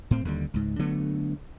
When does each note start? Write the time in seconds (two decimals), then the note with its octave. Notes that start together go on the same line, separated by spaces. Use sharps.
0.11 A2 C4
0.25 D#2 D3 G3
0.54 C#2 G#2
0.79 D3 F#3 A3 B3